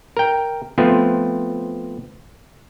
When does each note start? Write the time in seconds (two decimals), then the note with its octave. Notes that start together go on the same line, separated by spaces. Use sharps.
0.17 A#4 G5
0.78 F3 A3 B3 C4